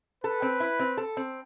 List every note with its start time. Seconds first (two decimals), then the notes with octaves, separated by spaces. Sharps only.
0.24 A4 B4
0.42 C4
0.60 E4
0.79 C4
0.97 A4
1.17 C4